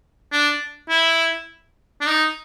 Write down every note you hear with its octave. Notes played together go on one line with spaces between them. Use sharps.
D4
E4
D4
D#4